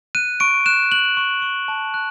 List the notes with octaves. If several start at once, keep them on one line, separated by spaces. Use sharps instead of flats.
F#6 D#7
C#6 D7
F#6 E7
F#6 F#7
C#6
C#6
A5
F#6